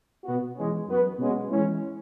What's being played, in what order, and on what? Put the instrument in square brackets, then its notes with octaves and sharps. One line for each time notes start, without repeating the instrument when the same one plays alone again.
[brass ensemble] B2 B3 F#4
E3 G#3 C#4
F#2 F#3 B3 F#4 B4
B2 G#3 C#4 F#4
E3 G#3 C#4 E4